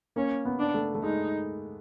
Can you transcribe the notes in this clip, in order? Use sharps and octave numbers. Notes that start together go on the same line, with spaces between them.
A#3 C#4
B3
D4
A3
A3
G#3 D#4